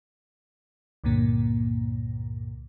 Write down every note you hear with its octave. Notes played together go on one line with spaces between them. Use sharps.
C#2 G2 A#2 D3 A#3